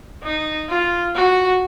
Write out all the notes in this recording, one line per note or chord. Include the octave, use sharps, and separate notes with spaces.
D#4
F4
F#4